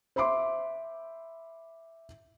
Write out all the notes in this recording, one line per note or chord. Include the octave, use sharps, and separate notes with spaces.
C5 E5 B5 C6 D6